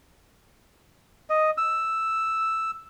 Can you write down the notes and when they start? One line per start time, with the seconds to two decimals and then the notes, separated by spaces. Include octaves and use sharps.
1.30 D#5
1.58 E6